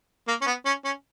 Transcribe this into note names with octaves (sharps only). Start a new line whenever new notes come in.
A#3
C#4
B3
C#4
C#4